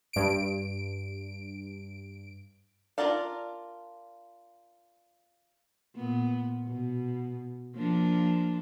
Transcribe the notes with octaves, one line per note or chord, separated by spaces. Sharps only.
G2 D7
D4 F4 A#4 D5 F5
A#2 B3
B2
F3 A#3 D4